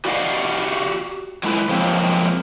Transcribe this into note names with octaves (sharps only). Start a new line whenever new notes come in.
F#4 G4 D5 D#5 F5 F#5
F#3 G#3 E4 A4 B4
F3 F#3 G#3 A#3 C4